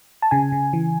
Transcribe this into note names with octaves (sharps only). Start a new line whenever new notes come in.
A5
C#3 G#5
C#3
E3